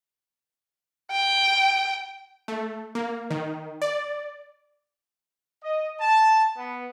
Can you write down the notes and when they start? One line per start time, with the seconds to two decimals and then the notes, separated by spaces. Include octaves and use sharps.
1.11 G5
2.48 A3
2.95 A#3
3.30 D#3
3.82 D5
5.63 D#5
6.00 A5
6.57 B3